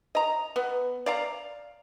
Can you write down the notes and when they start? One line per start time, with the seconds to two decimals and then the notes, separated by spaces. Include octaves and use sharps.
0.15 D#5 A#5
0.56 B3
1.06 D5 F5 A#5